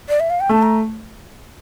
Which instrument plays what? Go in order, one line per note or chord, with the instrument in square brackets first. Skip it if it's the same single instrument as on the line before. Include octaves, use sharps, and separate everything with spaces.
[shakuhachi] D5
E5
F5
G5
[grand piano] A3 [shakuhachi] A5
[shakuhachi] A#5